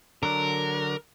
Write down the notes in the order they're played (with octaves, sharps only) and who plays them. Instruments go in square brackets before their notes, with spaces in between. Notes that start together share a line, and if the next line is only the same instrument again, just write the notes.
[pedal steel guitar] D3 F#3 D4 [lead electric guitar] A#4